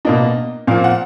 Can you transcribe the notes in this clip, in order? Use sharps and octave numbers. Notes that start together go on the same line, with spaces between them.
B2 A#3 D4 D#5
A#2 F3 A#3 F5
F#5